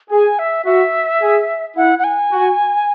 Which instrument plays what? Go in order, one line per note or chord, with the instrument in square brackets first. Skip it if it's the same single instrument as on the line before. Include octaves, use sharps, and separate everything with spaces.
[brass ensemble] G#4 [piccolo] G#5
[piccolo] E5
[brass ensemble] F#4 [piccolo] E5
[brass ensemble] G#4
[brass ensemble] E4 [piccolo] F#5
[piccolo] F#5
G#5
[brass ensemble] F#4